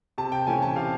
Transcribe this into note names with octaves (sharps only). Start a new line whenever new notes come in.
C3 A5
G5
E3 A3 C#4 G#5
A5
C3 F5